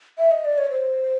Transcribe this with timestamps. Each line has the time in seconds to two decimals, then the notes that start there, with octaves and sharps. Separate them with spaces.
0.18 E5
0.31 D#5
0.45 D5
0.58 C#5
0.71 C5